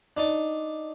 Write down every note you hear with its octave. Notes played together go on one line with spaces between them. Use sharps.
D4 D#4 D5